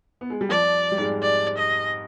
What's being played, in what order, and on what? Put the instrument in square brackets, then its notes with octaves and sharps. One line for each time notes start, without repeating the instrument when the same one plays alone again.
[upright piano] B3
G#3
G3
[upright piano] F2 F3 [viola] D5
[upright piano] G3
G#2 G#3
[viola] D5
D#5